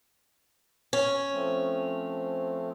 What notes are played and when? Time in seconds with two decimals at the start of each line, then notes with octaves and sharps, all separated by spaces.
0.93 C#4
1.32 F3 A3 C4